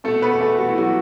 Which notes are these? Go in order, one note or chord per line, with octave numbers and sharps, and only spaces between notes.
B2 A3 A4
B3 B4
E2
A3 A4
A3 F#4
E4
F#3 F#4